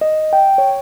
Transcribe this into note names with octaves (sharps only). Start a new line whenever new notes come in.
D#5
G5
C#5